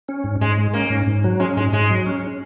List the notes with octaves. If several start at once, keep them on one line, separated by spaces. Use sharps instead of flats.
C#4
G#2
G#2 G#3
G#3
A#3 C#4
G#2
G#2
F#3
G#3 C#4
G#2 G#3
G#2 G#3
F#3
C#4